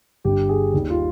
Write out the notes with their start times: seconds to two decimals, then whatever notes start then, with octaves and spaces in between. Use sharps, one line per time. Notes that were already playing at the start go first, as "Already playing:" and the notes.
0.24 G1 G2 G3 G4
0.49 G#4
0.73 D#2 D#3 G3
0.90 F4